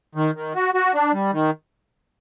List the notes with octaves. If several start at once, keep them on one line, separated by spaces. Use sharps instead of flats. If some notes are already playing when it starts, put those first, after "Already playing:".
D#3
D#3
F#4
F#4
D4
G3
D#3